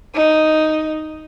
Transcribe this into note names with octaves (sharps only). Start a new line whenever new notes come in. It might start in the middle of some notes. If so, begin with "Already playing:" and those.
D#4